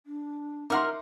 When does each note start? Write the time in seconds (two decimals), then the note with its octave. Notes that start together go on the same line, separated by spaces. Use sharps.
0.06 D4
0.70 D#4 A#4 E5 F#5 C6 D6 F6